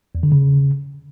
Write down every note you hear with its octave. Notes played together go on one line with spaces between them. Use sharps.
E2
D3
C#3